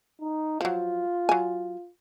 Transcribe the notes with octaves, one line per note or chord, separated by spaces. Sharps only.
D#4
F3 F#3 F4
F#3 G#5